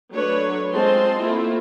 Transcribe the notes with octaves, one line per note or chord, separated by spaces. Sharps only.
F#3 A3 D4 B4 C#5
G#3 C4 F4 D#5 A5 C6
A3 A#3 C4 E4 F4